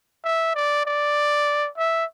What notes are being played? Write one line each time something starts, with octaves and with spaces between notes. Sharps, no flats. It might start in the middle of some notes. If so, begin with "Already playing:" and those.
E5
D5
D5
E5